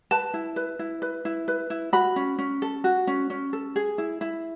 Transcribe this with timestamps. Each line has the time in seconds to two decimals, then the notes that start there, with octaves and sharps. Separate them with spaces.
0.11 B4 A5
0.34 E4
0.56 B4
0.79 E4
1.02 B4
1.25 E4
1.48 B4
1.70 E4
1.93 F#4 B5
2.16 C#4
2.38 C#4
2.62 A4
2.84 F#4
3.07 C#4
3.30 C#4
3.53 A4
3.76 G#4
3.98 E4
4.21 E4